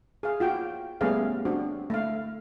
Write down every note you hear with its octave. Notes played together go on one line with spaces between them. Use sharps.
G#4 F5
F4 F#4 G5
G3 A3 B3 C#4 G#4 F5
C4 D4 F#4
A3 F5